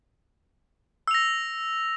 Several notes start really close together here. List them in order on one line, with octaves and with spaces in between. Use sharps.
E6 F7 A#6